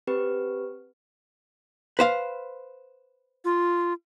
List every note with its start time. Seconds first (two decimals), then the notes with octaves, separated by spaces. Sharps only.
0.07 C4 G4 B4
1.99 B4 C5 F5
3.45 F4